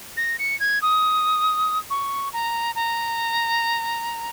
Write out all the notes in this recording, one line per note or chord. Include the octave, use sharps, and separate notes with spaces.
A#6
C#7
G#6
D#6
C#6
A#5
A#5